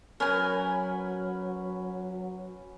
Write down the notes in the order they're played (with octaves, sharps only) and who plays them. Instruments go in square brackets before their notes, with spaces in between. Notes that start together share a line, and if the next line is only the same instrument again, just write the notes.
[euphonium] F#3 [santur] C#4 B4 [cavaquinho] A#4 G#5